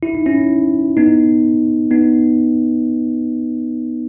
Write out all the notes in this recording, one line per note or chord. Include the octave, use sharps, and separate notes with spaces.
E4
D#4
C#4 E4
B3 D#4
B3 D#4